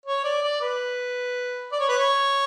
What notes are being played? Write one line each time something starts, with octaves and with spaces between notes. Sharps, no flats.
C#5
D5
D5
B4
D5
C#5
B4
C#5